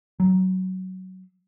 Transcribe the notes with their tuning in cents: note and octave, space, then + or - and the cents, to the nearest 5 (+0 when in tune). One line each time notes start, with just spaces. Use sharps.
F#3 +15